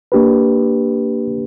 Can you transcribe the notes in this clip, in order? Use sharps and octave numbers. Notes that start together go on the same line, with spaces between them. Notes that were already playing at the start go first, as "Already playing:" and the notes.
A#3 D4 G4 B4